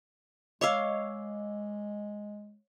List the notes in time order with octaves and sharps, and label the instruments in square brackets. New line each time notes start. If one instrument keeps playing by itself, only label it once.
[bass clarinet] G#3 [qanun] C#5 F5 [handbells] D#5 D6 E6